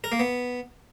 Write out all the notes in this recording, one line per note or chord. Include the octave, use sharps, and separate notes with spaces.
A#4
A#3
B3